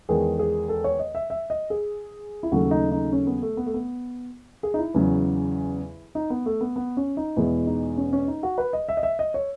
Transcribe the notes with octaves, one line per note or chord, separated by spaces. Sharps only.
E2 D#3 G#3 G#4
G#4
A4
C#5
D#5
E5
E5
D#5
G#4
E4
D#2 C#3 F#3 A3 F#4
D#4
D#4
C#4
B3
A3
B3
A3
B3
G#4
D#4
E4
E2 C#3 F#3
D#4
B3
A3
B3
B3
C#4
D#4
E2 B2 G#3 E4
D#4
C#4
C#4
D#4
F#4
B4
D#5
E5
D#5
E5
D#5
C#5